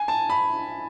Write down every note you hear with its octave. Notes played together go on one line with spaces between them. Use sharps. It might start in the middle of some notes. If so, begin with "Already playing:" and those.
Already playing: G#5
A5
B5